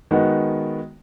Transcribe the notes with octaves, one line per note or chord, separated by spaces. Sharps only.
D#3 G#3 B3 D#4 F#4